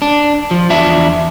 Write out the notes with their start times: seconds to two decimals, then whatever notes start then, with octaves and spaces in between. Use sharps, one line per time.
0.02 D4
0.51 F3
0.70 E2 D4 E5